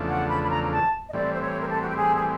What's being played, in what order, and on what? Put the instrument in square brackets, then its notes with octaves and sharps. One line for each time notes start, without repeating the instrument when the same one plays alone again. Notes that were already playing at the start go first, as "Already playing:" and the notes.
Already playing: [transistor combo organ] E2 C#3 F3 A3 D4
[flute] F#5
B5
B5
A#5
A#5
A5
D#5
[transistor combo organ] A2 E3 G3 C4 [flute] D5
[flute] C5
C#5
A#4
A4
F#4
G4
G#4
G#4